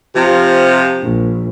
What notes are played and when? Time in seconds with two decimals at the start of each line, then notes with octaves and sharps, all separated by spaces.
0.16 C3 F3
1.03 A#1